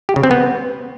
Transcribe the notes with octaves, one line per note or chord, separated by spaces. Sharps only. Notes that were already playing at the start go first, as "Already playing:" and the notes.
G4
C#3
C4
B3